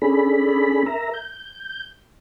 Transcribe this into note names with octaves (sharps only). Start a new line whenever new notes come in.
C#4 D4 G#4 A4 B5
A#4 E5 A#5
G6